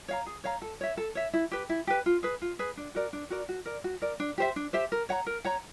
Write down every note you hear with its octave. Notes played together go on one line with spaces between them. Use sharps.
C#5 F5 A#5
G#4
C#5 F5 A#5
A4
C#5 E5
A4
C#5 E5
E4
G4 B4
E4
G4 B4
F4
G#4 B4
F4
G#4 B4
D4
F#4 A#4 D5
D4
F#4 A#4 D5
F#4
A#4 D5
F#4
A#4 D5
D4
G4 C5 E5
D4
G4 C5 E5
A#4
C#5 F#5 A#5
A#4
C#5 F#5 A#5